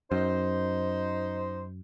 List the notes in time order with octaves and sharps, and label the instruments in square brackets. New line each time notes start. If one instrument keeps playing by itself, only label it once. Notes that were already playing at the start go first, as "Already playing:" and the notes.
[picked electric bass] F#2 [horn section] D#4 C5